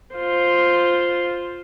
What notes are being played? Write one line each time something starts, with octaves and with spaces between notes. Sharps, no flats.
F4 C5